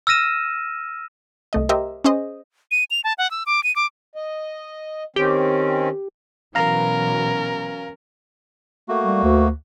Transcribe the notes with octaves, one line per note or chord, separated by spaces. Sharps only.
E6 F6 A#6 D#7 E7
C2 A3 D#5
G4 A#4 C5 D#5 E5
C#4 G#4 C5 D#5
D#7
F7
A5
F#5
E6
D6
D#7
D6
D#5
D#3 C4 C#4 G4
B2 E3 F#3 C#4 A#4 F5 A#5
A3 A#3 F#4
G3
D2